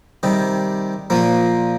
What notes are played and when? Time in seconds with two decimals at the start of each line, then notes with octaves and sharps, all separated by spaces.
0.23 C3 D#3 G3
1.10 A#2 F3 A#3